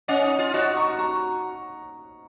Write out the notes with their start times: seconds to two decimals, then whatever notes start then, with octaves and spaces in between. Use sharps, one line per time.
0.08 C#4 D#5 F#5
0.24 D#4
0.39 F4
0.54 F#4 D#5
0.77 A#5 C#6
0.99 A#5 C#6